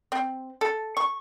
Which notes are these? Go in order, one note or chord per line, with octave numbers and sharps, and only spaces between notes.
C4
A4
C#6